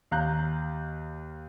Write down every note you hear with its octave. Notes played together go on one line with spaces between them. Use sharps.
D#2 F5 A#5 F#6 G6